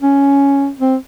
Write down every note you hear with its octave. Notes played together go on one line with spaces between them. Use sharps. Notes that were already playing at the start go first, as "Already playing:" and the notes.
C#4
C4